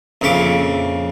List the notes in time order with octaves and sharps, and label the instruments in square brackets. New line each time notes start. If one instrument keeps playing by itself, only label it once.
[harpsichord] A#1 F2 C#3 C#5 E5 D6